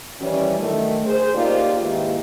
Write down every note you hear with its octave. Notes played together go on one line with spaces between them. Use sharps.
D#3 E3 G3 C#4
D3 D#3 F#3 A3
G#4 C5
C#3 A#3 D#4 F4 G4 D5
G#2 D#3 A#3 E4 G4 B4